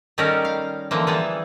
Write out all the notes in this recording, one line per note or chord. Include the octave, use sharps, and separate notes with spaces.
D#3 G3 C#4 F#4 A4 A#4
F5
D3 E3 F3 A#3
E3 G3 G#4 A4